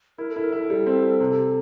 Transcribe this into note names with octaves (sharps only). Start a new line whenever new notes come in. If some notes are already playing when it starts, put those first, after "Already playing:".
E4 A#4
A4
E4
A#4
E4 A4
G3
C4
G3
C3